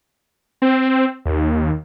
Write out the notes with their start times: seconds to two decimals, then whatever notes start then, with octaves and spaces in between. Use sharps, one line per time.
0.62 C4
1.25 D#2